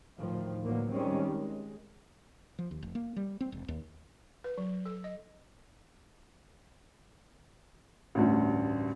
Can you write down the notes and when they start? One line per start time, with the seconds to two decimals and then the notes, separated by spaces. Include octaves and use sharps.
0.18 D2 A2 D#3 F3
0.64 A2 D3 E3 F#3 A#3
0.93 D#3 G3 G#3 C4 C#4
1.26 G#3
2.59 F3
2.71 D#2
2.83 F1
2.95 A#3
3.16 G3
3.41 C4
3.52 E1
3.68 D#2
4.44 B4
4.58 F#3
4.86 A4
5.04 D#5
8.15 A1 D2 G2